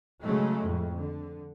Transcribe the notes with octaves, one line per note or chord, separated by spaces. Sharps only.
C#3 F#3 G#3 A3
F2 A2
D3